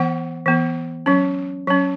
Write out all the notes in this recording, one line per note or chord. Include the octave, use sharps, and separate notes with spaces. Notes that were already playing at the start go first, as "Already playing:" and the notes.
Already playing: E3 B3 F#5
E3 B3
F#3 C#4
F#3 C#4